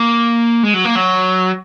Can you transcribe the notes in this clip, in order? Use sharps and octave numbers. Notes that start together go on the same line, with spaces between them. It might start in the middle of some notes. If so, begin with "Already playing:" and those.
Already playing: A#3
G#3
F#3
A#3
F#3